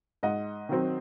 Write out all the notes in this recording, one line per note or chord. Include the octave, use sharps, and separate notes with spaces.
G#2 D#5 F#5
D#3 F#3 C4